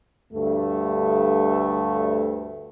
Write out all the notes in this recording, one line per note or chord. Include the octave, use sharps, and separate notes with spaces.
D2 G2 A3